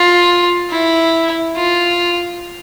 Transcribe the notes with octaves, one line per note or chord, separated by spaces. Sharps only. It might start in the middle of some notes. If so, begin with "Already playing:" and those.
Already playing: F4
E4
F4